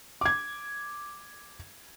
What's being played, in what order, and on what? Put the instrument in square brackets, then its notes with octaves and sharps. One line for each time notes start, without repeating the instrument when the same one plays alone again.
[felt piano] D6 G#6